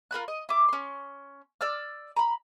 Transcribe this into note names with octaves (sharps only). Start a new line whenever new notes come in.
F4 A#4 B5 F#6
D#5
E4 D6
C#4 C6
D5 E6 F6
A#5 B5